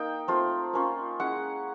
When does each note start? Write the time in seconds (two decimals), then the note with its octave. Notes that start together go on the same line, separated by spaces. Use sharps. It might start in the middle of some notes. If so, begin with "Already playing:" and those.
Already playing: A#3 D#4 G5
0.28 A3 C4 F4
0.73 A#3 C#4 F4
1.19 G#3 C#4 E4 F#5